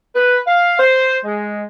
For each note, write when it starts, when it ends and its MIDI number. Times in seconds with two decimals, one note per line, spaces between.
0.16 0.40 71
0.47 0.76 77
0.80 1.18 72
1.24 1.64 56